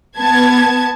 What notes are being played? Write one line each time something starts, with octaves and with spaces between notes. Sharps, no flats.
B3 A5 G#6